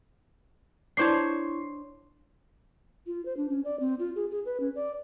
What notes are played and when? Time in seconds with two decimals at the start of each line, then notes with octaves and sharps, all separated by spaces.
0.97 D4 E4 C5 C#5 C#6 C7
3.07 F4
3.25 C5
3.37 D4
3.49 C#4
3.65 D5
3.80 C4
3.99 F4
4.15 G#4
4.31 G#4
4.45 B4
4.60 C#4
4.75 D5